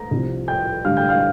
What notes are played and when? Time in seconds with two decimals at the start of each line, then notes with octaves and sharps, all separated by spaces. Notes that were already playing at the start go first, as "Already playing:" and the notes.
Already playing: A#5 A#6
0.11 C2 C3 F3
0.48 G5 G6
0.85 G2 D3 G3 F5 F6
0.97 G5 G6
1.09 F5 F6